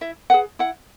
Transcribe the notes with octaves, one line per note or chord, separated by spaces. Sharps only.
E4 E5
G#4 B4 F#5
E4 F#5